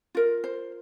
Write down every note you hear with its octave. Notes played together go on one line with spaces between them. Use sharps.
F4 A#4
C5